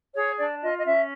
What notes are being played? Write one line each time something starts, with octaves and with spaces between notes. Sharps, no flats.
G#4 C#5
D4 D5
F4 D#5
D#5
C#4 E5